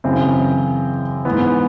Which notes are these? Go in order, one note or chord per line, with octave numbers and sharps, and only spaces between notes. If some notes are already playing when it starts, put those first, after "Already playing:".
F#2 C#3 E3 C4
E3 B3
G#2